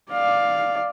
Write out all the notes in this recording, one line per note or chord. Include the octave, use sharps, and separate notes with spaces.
D5 F5